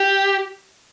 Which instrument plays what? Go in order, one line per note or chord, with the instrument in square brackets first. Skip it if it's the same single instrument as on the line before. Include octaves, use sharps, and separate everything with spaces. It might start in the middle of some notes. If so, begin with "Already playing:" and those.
Already playing: [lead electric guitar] G4